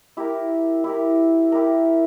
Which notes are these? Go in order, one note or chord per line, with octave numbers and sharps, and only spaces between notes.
E4 G4 A#4
E4 G4 A#4
E4 G4 A#4